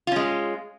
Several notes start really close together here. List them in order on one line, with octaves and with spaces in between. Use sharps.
F4 C#4 G#3